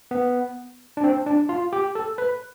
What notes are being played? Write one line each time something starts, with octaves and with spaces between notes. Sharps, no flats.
B3
D4
C4
D4
F4
G4
A4
B4